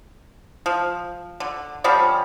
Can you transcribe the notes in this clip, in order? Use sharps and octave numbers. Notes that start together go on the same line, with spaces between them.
F3
D3
D3 F3 G3 C#4